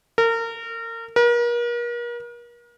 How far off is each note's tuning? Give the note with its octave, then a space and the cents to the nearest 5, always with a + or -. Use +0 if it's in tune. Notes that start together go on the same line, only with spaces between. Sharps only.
A#4 -30
A#4 +40